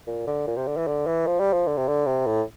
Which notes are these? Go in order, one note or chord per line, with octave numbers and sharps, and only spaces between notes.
A#2
D3
A#2
C3
D3
E3
D3
E3
F3
G3
F3
D3
C3
D3
C3
A2